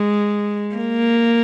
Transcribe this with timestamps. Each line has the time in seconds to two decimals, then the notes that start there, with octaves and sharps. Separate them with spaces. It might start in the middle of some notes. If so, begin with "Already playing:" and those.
Already playing: G#3
0.75 A#3